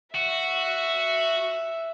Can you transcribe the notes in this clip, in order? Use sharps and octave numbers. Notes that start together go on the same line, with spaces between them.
F#4 E5